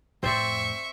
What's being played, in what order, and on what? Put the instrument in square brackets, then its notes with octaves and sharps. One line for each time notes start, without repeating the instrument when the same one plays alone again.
[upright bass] F2 A2 [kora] C4 C5 D5 [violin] E5 C#6